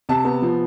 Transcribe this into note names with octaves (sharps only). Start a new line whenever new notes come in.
C3 A5
B3
F3